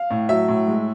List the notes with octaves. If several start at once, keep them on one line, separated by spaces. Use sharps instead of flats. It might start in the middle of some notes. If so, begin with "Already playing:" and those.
Already playing: F5
A2
F#3 E5
A2
G#3